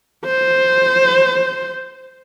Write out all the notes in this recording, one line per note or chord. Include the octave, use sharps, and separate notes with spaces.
C5